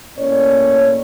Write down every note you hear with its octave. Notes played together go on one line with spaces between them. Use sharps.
A2 A#3 C#4 C#5 D5